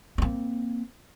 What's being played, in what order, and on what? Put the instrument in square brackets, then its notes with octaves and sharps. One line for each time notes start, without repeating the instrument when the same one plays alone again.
[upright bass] A#3 C4